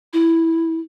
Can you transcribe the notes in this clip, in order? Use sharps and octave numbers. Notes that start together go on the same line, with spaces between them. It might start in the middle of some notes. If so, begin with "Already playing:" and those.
E4